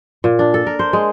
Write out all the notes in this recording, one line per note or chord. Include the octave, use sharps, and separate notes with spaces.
A#2
D4
A4
A#4
C5
G#3